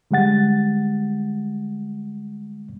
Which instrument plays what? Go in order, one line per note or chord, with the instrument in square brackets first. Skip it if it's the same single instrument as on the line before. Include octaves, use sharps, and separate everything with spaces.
[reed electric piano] D3 G3 G#3 F#5 A6